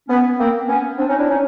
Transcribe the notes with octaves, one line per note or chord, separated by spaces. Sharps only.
B3 C#4
A#3 C4
B3 C#4
C4 D4
C#4 D#4
D4 E4
C#4 D#4